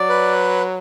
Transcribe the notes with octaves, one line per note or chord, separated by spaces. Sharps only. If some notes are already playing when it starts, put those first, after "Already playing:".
Already playing: F#3 D5
B4